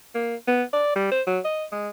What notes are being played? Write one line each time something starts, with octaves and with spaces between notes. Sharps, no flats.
A#3
B3
D5
G3
C5
F#3
D#5
G#3